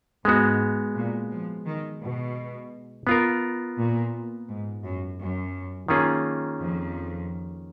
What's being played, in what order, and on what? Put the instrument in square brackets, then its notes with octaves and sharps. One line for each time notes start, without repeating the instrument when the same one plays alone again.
[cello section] G#2 [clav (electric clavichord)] G#3 B3 F#4
[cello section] A#2
F3
D#3
B2
[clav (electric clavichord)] B3 F4 A#4
[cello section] A#2
G#2
F#2
F#2
[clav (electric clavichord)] D#3 A#3 C#4 F4 G#4
[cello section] F2